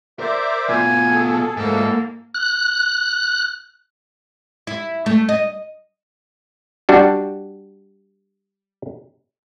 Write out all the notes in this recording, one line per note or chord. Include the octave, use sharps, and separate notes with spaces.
A#4 C5 D5 E5
B2 F4 G#5
G#4 A4
D2 G#2 E3 F3 A#3 A4
F#6
E4
A3
D#5
G3 D4 F#4